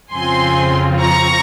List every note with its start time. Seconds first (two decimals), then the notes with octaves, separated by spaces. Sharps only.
0.13 F2 C#3 F3 C4 F4 G#5 C6
1.01 A#5 C#6